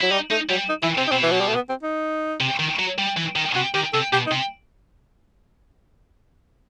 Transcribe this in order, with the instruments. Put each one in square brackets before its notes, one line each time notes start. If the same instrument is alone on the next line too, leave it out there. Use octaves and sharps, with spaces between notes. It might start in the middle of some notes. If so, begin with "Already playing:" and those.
[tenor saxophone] F#3 [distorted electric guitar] E4
[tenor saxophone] G3 [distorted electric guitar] D#4
[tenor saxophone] A3 [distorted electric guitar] D#4
[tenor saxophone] F#3 [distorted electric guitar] G3
[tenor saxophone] D#4
[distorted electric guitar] E3 [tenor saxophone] E4
[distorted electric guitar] C3 [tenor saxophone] C4
[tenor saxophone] D#4
[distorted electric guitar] B2 [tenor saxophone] C4
[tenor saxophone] E3
F#3
G3
A3
B3
C4
D#4
[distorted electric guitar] C3
D#3
F#3
G3
E3
D#3
[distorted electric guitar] C3 [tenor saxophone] F#4
[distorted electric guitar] D#3 [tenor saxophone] G4
[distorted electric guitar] C3 [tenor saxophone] A4
[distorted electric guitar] B2 [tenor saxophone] G4
[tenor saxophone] D#4
[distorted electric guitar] C3